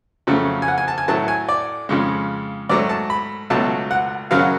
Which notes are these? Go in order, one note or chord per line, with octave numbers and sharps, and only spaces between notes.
F2 C#3 F#3 A3
G#5
F#5
G#5
A5
G#5
A2 F#3 A3 A5
G#5
D5
F2 C#3 G#3
G#2 F#3 A3 D5
A5
B5
C#2 B2 F#3 A3 A5
F#5
F#2 C#3 F#3 F5
F#5